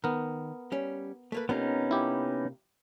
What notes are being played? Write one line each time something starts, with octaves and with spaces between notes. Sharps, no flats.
D#3 B3 A#4
G3 C#4
A3 A#3 B4
C3 A#3 B3 C#4 D#4 F4
E4 G4